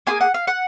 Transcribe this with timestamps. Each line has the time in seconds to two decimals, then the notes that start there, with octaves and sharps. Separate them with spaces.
0.07 A#3 F4 G#4 G#5
0.21 F#5
0.34 F5
0.47 F#5